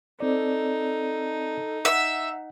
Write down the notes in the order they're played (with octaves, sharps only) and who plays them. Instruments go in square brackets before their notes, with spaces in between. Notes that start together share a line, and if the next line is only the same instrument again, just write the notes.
[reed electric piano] C4 D5 [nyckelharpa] D#4 [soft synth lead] A4
[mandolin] E5 [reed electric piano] F#5